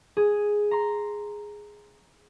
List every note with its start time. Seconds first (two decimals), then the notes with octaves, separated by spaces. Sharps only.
0.17 G#4
0.71 A#5 C6